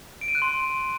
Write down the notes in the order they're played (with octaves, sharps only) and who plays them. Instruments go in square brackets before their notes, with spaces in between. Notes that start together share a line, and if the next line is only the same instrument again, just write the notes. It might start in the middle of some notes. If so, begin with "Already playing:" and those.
[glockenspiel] D7
D#7
F#6
C6